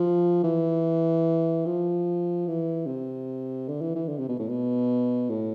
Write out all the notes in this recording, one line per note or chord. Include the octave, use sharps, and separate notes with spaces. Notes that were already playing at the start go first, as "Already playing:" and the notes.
Already playing: F3
E3
F3
E3
C3
D3
E3
E3
D3
C3
B2
A2
B2
A2